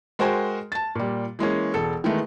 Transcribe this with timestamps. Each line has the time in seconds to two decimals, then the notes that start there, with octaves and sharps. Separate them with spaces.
0.19 G#3 F#4 A#4 C5 G5 G#5
0.72 A5 A6
0.95 A#2 G3
1.39 E3 G#3 A#3 C#4
1.74 E1 A4
2.04 D#3 E3 G#3 A3 B3